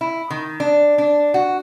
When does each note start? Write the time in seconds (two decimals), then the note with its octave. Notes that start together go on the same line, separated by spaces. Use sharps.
0.01 E4
0.30 D#3
0.60 D4
0.98 D4
1.34 F#4